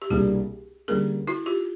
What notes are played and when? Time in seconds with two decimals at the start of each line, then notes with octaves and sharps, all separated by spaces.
0.02 G4
0.10 C2 B2 G3 A#3 D4 F#4 G#4
0.88 D3 G3 A#3 C#4 G#4 A#4
1.27 E4 F#4
1.46 F4 G4